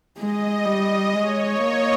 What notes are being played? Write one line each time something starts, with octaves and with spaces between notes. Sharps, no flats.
G#3 D#5
G3 D#5
G#3 C#5
A#3 D#5